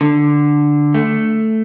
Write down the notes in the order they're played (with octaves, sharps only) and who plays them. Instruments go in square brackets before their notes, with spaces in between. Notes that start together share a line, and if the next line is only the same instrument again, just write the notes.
[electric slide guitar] D3
A3